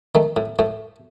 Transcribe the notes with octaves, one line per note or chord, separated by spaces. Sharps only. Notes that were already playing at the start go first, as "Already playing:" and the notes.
D#3 A3
A2
A2 A3